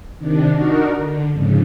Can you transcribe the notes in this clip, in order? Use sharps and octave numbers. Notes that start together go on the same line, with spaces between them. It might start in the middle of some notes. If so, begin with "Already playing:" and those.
C3 D#3 D4
D4 D#4 F#4 A#4
D3
F2 G#2 C#3